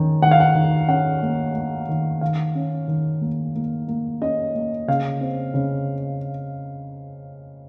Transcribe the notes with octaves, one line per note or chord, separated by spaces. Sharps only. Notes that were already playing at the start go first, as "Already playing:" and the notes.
Already playing: D#3 C#4
D#3 F#5
F5
F#5
D#3
C#4 F#5
A#3
A#3
D#3
D#3 F5
C#4
D#3
A#3
A#3
A#3
C#4 D#5
A#3
C#3 F5
C4
C#3